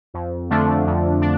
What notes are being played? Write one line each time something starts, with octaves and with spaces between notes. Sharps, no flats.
F2
D3 F3 A3 D4
F2
D4